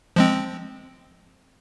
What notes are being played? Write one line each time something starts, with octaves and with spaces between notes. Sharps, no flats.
F3 G#3 C4